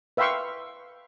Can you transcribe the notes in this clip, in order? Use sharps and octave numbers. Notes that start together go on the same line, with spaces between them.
B4 E5 F5 G5 C6 C#6